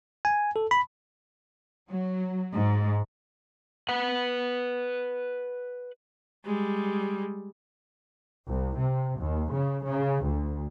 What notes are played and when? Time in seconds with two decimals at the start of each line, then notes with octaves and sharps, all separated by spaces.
0.25 G#5
0.56 A4
0.71 B5
1.89 F#3
2.53 G#2
3.89 B4 F#5
6.46 G3 G#3
8.48 C2
8.79 C3
9.19 D#2
9.52 C#3
9.84 C#3
10.23 D2